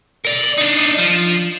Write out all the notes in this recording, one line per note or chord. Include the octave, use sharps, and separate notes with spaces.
A#4 D5
D4 D#4
F3